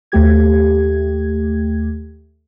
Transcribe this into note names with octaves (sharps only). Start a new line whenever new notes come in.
D#2 A3 G4 G#6